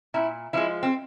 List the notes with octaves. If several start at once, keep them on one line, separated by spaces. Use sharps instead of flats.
A#2 E4
F3 G#3 E4
C4